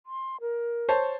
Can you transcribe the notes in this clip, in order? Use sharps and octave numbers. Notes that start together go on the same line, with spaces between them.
C6
A#4
C5 C#5 A5